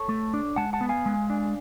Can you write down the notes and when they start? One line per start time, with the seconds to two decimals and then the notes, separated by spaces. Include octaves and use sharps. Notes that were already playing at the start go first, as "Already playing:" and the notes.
Already playing: A4 C#5
0.09 A3
0.34 D4
0.56 G#3 F#5 A5
0.73 F#5 A5
0.81 B3
0.89 F5 G#5
1.06 G#3
1.30 D4